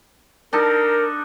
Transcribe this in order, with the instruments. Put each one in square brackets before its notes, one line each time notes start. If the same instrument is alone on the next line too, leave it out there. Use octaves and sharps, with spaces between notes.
[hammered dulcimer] D4 D#4 A4 [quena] A#4